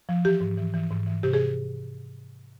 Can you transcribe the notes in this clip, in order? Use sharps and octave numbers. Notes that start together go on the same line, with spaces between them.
F3
E3 G4
G#2
E3
E3
G#2
E3
C3 G4
G#4